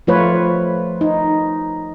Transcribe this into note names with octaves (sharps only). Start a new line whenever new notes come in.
F3 A3 F4 B4 C#5
D#4